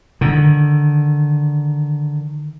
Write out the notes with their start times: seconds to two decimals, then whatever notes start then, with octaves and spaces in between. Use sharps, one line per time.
0.21 D3 D#3